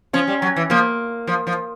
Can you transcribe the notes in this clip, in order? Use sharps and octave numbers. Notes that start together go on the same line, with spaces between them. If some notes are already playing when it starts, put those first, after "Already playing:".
F3 C#4
G3
F#3
E3
F3 A#3
F3
F3